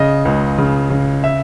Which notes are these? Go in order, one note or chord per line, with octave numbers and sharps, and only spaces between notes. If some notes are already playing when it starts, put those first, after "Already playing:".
Already playing: C#3 D#5
C#2
C#3
C#3
E5